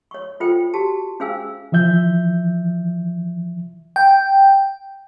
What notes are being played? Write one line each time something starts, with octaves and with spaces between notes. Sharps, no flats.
C#5 C#6
F4 A4 C5 G5
F#4 G4 A5
C#4 G#4 C5 F5 G#5 E6
E3 F3 E5 G6
G5